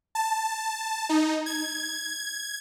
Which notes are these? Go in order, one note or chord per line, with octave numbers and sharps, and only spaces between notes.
A5
D#4
G#6